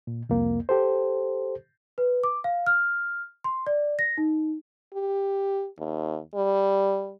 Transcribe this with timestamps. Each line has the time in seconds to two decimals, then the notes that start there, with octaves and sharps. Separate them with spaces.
0.07 A#2
0.29 C2 F2 A#3
0.69 G4 A4 C5
1.98 B4
2.24 D6
2.44 F5
2.66 F6
3.44 C6
3.67 D5
3.99 A#6
4.18 D#4
4.94 G4
5.79 D#2
6.35 G3